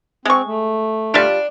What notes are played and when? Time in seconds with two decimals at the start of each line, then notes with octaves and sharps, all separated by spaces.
0.25 G#3 C4 C#6
0.46 A3
1.14 G3 D4 F4